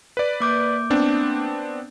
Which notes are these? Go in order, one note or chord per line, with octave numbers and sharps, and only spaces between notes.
B4 D5
A#3 D6 G6
B3 C4 D4